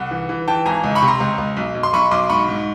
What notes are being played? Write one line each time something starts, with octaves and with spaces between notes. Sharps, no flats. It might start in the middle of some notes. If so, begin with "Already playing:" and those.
Already playing: C2 F#5
E3
E3
E3 G5 A5
G#1 G#5 A#5
C#2
B5 C#6
C3
A#5 C6
C#2
C#2
B1
B1
C6
B1 B5 C#6
B1 C6 D6
G#2 B5 C#6
G#2